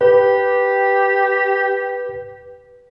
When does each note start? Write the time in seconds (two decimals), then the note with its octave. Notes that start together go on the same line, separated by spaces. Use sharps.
0.01 G4 B4